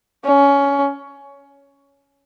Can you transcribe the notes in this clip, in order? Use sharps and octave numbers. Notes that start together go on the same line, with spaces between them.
C#4